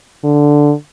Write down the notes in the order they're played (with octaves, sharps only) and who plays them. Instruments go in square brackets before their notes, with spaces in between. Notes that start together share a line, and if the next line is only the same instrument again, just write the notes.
[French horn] D3